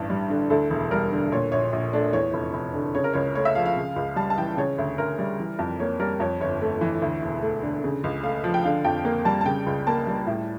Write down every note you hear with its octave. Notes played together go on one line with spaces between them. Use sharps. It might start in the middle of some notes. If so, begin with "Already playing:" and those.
Already playing: A1 G2
G3
D3
D2 A4
E1
G3 A#4
D3
A#2 C#5
A#1 C#5
A#1
A3 D4
E2 C#5
F1
F1
D3
C#3 C#5
A#4
C#2 C#5
A3 C#5
E5
F3 F5
F5
C#3
C#2
G3 A5
A5
E3 G5
C#3 C#5
D2
D2 A#4
G3
E3
F2
A#3 C#5
G3 A#4
F2 C#5
G1 C#5
A3
E3
D2
E1
A3
D3
C#3
C#2
A3 F5
F3
G5
D3 F5
F2 G5
A#3
G3 A5
A5
C#3 G5
C#2
A#3 A5
G3
A2